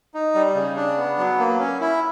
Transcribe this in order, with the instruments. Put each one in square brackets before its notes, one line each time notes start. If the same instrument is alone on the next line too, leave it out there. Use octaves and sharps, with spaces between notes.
[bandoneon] D#4
G3
C#3
D4
B3
F#3
A#3
C#4
E4